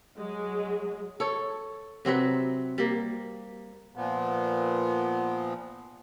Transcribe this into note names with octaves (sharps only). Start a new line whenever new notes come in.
F#3 G#3
A4 C#5
C3 F#3 C4 B4
G3 A#3
A#2 F3 B3